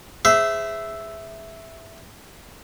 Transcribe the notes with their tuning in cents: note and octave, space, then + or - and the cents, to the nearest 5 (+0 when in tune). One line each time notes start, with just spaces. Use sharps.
G#4 -10 C5 -35 E5 +0